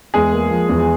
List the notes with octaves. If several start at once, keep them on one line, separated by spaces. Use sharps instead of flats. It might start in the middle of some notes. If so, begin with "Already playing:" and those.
E2 G#3 G#4
A#3
F3
E2